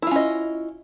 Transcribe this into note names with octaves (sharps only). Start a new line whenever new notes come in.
C#4 E4 F4 D#5